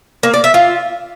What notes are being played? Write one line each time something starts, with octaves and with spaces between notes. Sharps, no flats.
A#3
D5
E5
F4